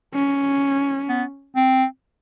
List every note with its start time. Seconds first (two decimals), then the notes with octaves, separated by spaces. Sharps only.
0.14 C#4
1.09 B3
1.56 C4